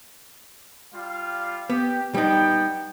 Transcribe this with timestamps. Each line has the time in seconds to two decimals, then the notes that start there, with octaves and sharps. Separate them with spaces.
0.94 G3 F4 F5
1.70 B3 G4
2.14 G3 B3 D#4 G5